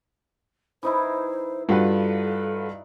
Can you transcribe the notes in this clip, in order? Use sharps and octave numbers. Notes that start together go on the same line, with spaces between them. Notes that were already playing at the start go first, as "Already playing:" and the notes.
E3 D#4 E4 C5
G2 F4 F#4 A4 B4